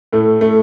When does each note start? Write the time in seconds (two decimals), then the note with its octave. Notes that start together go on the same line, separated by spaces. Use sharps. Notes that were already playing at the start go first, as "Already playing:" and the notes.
0.13 A2 A3
0.41 A3